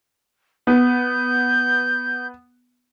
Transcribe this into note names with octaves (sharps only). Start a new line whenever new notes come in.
B3 G6